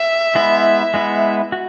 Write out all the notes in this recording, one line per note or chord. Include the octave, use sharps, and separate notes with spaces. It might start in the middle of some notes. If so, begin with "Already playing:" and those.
Already playing: E5
G#3 B3 E4
G#3 B3 E4
F#4